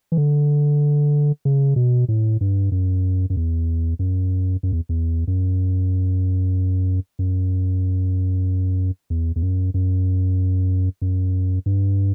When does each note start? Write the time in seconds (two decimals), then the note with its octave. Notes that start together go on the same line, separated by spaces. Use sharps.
0.12 E3
0.17 D3
1.45 C#3
1.76 B2
2.08 A2
2.41 G2
2.72 F#2
3.30 F#2
3.37 E2
3.99 F#2
4.63 F#2
4.72 E2
4.89 E2
5.28 F#2
7.19 F#2
9.10 E2
9.36 E2
9.42 F#2
9.74 F#2
11.02 F#2
11.66 G2